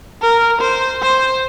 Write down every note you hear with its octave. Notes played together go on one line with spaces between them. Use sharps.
A#4
C5
C5